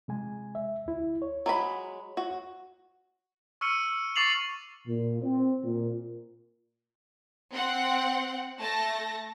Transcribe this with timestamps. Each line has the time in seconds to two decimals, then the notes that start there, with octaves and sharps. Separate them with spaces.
0.08 C3 G#3 G#5
0.55 E5
0.86 D2 E4
1.22 C#5
1.46 F#3 G#3 B5
2.17 F#4
3.61 C#6 E6 F6 C#7 D#7
4.16 C#6 D6 A6 C7 F7 F#7
4.87 A#2
5.22 C4
5.64 A#2
7.53 C4 F#5
8.59 A3 A5 A#6